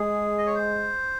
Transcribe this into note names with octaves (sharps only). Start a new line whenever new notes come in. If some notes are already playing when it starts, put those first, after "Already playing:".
Already playing: G#3 G#4
D#5
C#5
C5